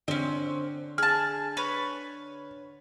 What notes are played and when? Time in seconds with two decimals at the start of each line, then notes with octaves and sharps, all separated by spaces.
0.08 D3 C4 C#4
0.98 G#4 A5 F6
1.57 B4 C#5